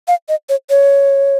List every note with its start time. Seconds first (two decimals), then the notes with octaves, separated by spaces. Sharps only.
0.08 F5
0.29 D#5
0.49 C#5
0.70 C#5